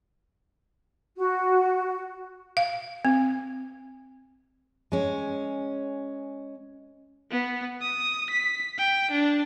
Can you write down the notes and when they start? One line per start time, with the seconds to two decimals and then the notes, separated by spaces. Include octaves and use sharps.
1.17 F#4
2.57 F5
3.05 C4
4.92 G#3 C#4
7.31 B3
7.82 D#6
8.30 B6
8.78 G5
9.12 D4